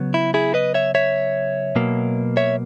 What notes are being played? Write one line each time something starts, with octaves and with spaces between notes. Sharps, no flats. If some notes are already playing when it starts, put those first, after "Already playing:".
Already playing: C#3 F#3 B3
E4
E4 G#4
B4 D#5
C#5 E5
C#5 E5
B2 F#3 A#3
C#5 E5